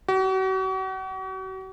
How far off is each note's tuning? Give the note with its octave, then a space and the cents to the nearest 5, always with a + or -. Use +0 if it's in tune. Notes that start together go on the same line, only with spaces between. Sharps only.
F#4 +40